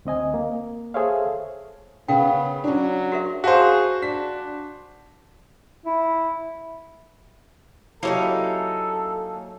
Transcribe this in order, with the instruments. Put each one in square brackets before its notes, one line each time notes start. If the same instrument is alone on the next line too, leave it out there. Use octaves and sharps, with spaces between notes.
[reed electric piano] D2 C4 D#5 G#5
A#3
G#4 A4 C5 C#5 E5 F5
[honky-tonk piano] C#3 C#4 [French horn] B3 [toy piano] A#4 F5 G5
[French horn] F#3 [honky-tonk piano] C#4 D4
[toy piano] F#4 A#4 E5
[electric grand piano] F#4 C5 [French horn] G#4 [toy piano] F5 A5
[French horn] D4 [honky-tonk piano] B6
[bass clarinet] E4
[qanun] F#3 E4 G4 [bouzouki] A#3 C#4 D#4 [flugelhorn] A4